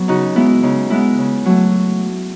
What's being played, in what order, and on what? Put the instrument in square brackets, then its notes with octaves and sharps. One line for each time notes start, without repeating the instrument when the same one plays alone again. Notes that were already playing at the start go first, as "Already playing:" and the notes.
Already playing: [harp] F#3 B3
C#3 D#4 F#4
G#3 B3 E4
C#3 D#4
G#3 B3 E4
C#3
F#3 A3